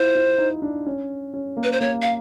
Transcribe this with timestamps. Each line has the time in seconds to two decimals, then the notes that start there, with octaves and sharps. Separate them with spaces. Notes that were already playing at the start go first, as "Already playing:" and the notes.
Already playing: E4 F4 C5
0.15 E4
0.38 D#4
0.62 D4
0.86 C#4
1.34 C#4
1.57 A#3
1.63 B4
1.72 C5
1.81 A#3 C#5
2.02 F5